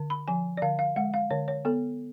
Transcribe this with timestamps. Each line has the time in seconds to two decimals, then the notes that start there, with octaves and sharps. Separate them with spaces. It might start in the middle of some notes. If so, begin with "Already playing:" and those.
Already playing: D3
0.10 B5
0.28 F3 G#5
0.57 D5
0.62 D3 F5
0.79 F5
0.96 G#3 F#5
1.14 F5
1.31 D3 C#5
1.48 C#5
1.65 B3 A4